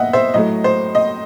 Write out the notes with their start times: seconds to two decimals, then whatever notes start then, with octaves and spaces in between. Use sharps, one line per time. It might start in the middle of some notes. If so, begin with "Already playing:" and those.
Already playing: D#5 E5 F#5
0.13 C5 E5
0.34 A2 F#3 A3 D#5
0.64 C5
0.95 D#5